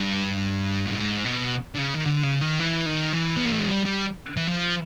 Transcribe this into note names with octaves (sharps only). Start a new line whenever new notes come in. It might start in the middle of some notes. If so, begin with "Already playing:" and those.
Already playing: G2
A2
G#2
B2
D3
C#3
D#3
D3
C#3
D#3
E3
D#3
E3
B3
A#3
A3
G#3
G3
G3
E3
F3